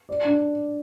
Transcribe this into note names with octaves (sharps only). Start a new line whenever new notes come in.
D5
D4